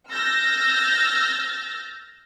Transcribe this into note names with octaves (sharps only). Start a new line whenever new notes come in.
E6 F6 G6 A6 A#6